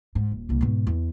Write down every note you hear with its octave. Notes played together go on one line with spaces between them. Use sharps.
G#2
D#1
C2 A#3
G#2 B2
E2